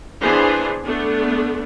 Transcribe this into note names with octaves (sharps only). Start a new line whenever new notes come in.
E3 B3 D4 G#4 C5
A3 B3 D4